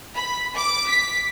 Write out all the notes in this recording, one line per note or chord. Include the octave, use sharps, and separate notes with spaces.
B5
D6
B6